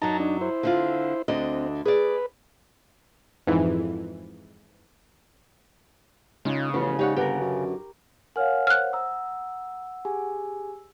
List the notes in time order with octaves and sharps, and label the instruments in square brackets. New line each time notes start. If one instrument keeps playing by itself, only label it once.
[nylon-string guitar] F#2 F#3 [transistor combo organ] D#4 A5 A#5
[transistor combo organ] D4 D#4
E4 C5
[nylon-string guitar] D3 C4 F4
[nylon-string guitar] D2 D4 D#5 [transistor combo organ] C4
[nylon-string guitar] G#4 D5 [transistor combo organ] B4
[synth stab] F2 G#2 E3
[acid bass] C#3 [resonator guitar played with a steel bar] G#3 [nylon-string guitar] C#4 D#4 F4
[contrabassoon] A1 [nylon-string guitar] F3 C#4 F4 [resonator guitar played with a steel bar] B3
[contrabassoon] G#2 [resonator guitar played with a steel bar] D#4 C#5 F#5 [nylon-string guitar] G4
[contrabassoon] G1 [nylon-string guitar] D3 B4 F#5 [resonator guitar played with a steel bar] G4 A#4
[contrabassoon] F#2
[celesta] A#4 C#5 F5 [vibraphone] F#5 [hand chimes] G#5 F6
[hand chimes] C5 [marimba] F6 F#6
[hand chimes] A#5 D#6 [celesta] E6
[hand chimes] G4 G#4 G#5